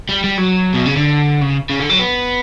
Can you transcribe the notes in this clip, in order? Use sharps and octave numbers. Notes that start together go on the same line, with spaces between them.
G3
G3
F#3
B2
C#3
D3
C#3
C#3
D3
F#3
B3